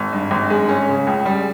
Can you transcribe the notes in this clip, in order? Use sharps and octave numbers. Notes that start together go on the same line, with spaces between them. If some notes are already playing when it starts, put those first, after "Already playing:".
Already playing: G#1
G2
G#1
G#3
C#4
C#3
C#2
G3